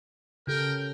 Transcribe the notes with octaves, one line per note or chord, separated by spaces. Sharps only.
C#3 G4 A4 A#4 G5